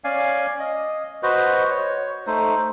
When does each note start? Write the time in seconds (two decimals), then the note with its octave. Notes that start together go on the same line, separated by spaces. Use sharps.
0.04 C#4 D5 F5 G#5
0.60 D#5
1.23 F#4 B4 C5 D#5
1.70 C#5
2.27 A3 D#4 C5